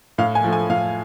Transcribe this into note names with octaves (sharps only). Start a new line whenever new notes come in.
A2 F5
G#5
F3 A3
G#5
A2 F5